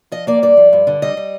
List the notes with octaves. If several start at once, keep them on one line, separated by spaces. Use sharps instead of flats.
F3 D#5
A#3 D5
G2 D5
F3
G2
D3
G3 D#5
G3